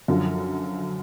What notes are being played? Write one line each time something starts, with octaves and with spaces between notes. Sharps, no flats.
F#2 D3 F3